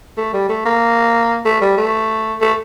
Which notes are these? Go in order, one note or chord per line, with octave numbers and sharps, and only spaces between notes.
A3
G3
A3
A#3
A3
G3
A3
A3